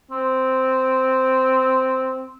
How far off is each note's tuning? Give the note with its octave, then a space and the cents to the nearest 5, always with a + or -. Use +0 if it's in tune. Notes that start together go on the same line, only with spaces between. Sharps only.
C4 -5